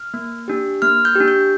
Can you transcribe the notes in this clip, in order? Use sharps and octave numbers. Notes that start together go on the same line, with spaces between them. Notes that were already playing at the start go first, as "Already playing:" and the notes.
Already playing: F6
A#3
D4 G4
A#3 F6
G6
D4 G4
G6